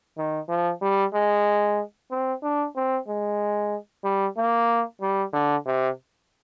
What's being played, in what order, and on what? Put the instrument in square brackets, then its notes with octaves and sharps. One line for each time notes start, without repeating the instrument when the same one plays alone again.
[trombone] D#3
F3
G3
G#3
C4
D4
C4
G#3
G3
A#3
G3
D3
C3